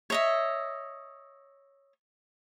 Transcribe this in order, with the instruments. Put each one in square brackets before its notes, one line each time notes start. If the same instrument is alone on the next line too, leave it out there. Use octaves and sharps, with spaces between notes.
[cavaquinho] C#5 D#5 E5